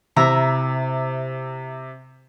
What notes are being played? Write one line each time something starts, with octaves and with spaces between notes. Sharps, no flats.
C3 E4 E5 A#5